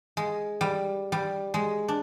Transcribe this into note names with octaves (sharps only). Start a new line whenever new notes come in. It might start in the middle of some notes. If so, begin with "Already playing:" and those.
G#3
G3
G3
G#3
D4